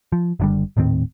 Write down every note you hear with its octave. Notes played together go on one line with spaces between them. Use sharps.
F3
F#1 D3 G3
D#1 A2 D#3 C4